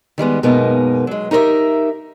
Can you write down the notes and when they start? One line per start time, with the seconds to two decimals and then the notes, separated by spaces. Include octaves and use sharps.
0.18 D#3 G3 G#3 B3
0.43 F#2 B2 G#3 A#3 B3 D#4
1.07 F#3 G#3
1.31 D#4 G4 A#4 C5 E5